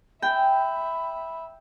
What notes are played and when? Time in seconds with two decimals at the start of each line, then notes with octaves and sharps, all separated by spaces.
0.22 E5 G5 B5